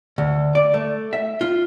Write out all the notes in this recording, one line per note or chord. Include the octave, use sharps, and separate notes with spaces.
D2
D5
A3
E5
F4